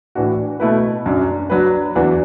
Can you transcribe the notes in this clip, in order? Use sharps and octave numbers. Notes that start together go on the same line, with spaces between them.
A2 E3 D4 F#4
B2 A3 E4 B4
F#2 F#3 D4
F#3 D4 B4
E2 E3 D4 F#4